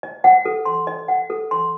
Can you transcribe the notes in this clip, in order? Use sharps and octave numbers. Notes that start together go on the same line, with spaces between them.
D#5
F#5
A4
C6
D#5
F#5
A4
C6